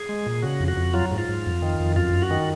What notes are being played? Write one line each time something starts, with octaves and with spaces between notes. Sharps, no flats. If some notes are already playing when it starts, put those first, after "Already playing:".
Already playing: G#4
G#3
A#2
C#3 F#4
F2
F#4
F2
F#3 F4
G#2
F4
G#2
F2
D#3
F2
F#2 F4
F#2
F#4
D#3